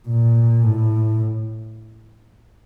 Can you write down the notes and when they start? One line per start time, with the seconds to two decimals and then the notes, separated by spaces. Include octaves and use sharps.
0.08 A#2
0.63 A2